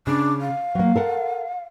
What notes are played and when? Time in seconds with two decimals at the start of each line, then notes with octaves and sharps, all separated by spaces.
0.07 C#3 D4
0.41 F5
0.75 F#3 A#3
0.96 A4 A#4 F#5